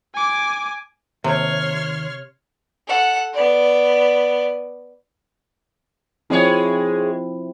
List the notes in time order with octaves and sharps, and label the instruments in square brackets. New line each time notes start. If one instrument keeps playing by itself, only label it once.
[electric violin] G#5 D6
[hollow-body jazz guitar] D#2 [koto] C3 [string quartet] C#5 C6 F6
[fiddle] A4 F#5
B3 D5
[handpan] F3 C4 E4 [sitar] G#3 G#4 C#5